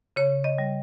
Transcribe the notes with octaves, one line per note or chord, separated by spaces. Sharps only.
C#3 C#5
D#5
G3